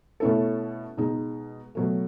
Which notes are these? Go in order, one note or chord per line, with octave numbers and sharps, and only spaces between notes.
B2 A3 C#4 E4 A4
B2 G#3 D#4
B2 F#3 A3